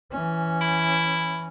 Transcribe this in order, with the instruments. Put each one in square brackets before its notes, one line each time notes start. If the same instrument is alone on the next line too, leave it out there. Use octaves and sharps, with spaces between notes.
[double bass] E3 C#4
[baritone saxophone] E4